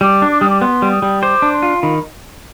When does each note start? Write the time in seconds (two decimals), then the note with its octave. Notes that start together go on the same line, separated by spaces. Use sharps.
0.01 G3 D6
0.22 D4
0.32 D6
0.41 G3 D#6
0.50 D6
0.61 B3 C6
0.82 G3
0.92 D#6
1.02 G3
1.22 C5 D6
1.42 D4
1.53 C6
1.63 F4
1.82 D#3 B5